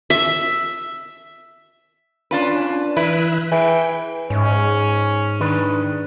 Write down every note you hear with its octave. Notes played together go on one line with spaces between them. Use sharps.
E5
C#4 D4 F4 B4
E3 E4 B4 E5 F#6
E3 G#4 G5
G#2 C#4
D#3 D4 B4